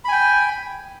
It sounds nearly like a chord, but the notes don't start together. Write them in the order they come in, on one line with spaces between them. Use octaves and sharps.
B5 G#5 G5